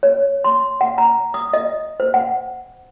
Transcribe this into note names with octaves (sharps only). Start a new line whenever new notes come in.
C#5
C6
F#5
A#5
D#6
D#5
C5
F#5